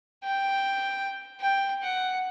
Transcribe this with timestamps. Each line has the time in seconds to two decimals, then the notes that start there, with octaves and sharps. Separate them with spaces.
0.24 G5
1.40 G5
1.83 F#5